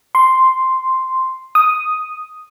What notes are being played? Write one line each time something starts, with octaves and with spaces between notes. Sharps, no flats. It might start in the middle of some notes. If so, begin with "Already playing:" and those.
C6
D#6